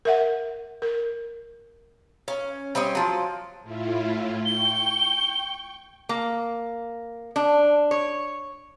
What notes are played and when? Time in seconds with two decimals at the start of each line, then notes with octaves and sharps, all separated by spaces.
0.05 A#4 E5 F#5
0.82 A#4
2.28 C#4
2.75 G3 C4 C#4 D#5
2.95 F3 F#3
3.63 A2 E4 F4
4.45 G5 C#6 G7
6.09 A#3
7.36 D4
7.91 C#5